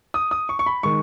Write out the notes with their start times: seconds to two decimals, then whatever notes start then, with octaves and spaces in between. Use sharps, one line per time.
0.14 D#6
0.31 D#6
0.49 C#6
0.59 C#6
0.66 B5
0.83 D#3 G#3 C#6